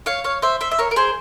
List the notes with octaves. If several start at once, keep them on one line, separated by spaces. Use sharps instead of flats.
C#5 F5
C#5 F5
C5 E5
C5 E5
E5
A#4 C#5
A#4
G#4 C5